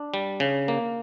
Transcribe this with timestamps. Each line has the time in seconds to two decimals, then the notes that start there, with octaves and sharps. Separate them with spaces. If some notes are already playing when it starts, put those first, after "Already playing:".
Already playing: D4
0.14 G3
0.40 C#3
0.68 A#3